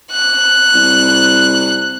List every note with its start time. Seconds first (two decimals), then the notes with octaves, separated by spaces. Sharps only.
0.12 F#6
0.74 C2